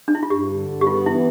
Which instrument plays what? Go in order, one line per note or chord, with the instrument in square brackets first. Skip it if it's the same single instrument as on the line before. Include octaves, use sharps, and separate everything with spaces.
[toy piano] D4
E4
F4
[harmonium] G2 [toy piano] G4
[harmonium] D3
G2
[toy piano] G4
[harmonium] B3 [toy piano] F4
[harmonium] E3 [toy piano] E4